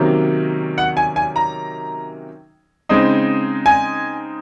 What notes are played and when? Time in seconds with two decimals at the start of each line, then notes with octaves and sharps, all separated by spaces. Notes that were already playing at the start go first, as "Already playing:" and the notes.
Already playing: C3 D#3 F#3 A#3 C#4
0.78 F#5
0.97 G#5
1.16 G#5
1.36 A#5
2.89 C#3 G#3 C4 D#4
3.66 G#5